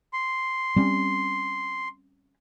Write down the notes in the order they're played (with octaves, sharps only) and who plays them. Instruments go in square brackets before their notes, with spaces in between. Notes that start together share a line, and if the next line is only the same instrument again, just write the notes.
[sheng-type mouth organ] C6
[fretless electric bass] G3 C4 C#4